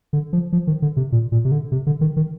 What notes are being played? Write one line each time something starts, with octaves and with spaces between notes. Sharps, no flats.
D3
F3
F3
D#3
D3
C3
A#2
A#2
C3
D3
C3
D3
D#3
D#3